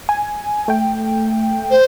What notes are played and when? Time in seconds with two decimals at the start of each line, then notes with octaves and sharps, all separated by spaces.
0.09 G#5
0.68 A3 G5
1.71 C5